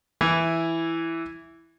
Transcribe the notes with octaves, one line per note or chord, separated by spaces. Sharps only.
E3 E4